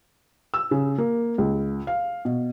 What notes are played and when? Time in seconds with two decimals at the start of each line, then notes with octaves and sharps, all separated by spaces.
0.54 E6
0.71 C#3
0.98 A#3
1.38 C#2
1.87 F5
2.25 B2